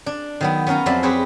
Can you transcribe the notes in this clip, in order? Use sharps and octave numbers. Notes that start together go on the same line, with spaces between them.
D4
D#3 F#3 B3
B3 C#4 A#4 F5 A#5
F2 F#3 C5 D5 E5 A5
C4 G4 G#4 B4 C#5